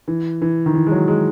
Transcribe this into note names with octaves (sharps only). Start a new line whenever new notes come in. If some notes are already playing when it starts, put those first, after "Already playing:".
E3
E3
D#3
E3
G#3
F#3
G#3